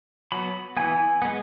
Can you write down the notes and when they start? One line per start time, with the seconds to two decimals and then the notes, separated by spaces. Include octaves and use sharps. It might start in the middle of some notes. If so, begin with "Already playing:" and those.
0.32 F#3 B3 B5
0.77 E3 B3 G#5
1.22 G#3 B3